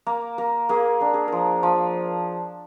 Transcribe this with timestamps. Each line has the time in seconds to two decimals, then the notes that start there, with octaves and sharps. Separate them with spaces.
0.06 A#3 A#4
0.38 A#3 A#4
0.69 A#3 G#4
1.01 D4 A#4
1.14 G#4
1.28 F3 A#4
1.63 F3